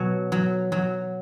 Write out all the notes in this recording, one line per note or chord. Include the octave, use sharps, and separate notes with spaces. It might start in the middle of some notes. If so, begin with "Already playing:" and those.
Already playing: B2 F#3
F#3
F#3